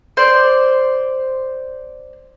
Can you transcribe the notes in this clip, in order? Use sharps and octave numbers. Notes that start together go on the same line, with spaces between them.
C5 D5